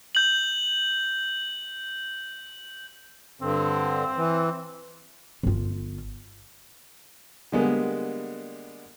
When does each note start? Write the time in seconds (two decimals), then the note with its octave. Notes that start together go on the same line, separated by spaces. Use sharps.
0.15 G6 F#7
3.41 G2 D3 C4
4.16 E3
5.43 G1 F4
7.52 D3 G3 G#3 A#3 B3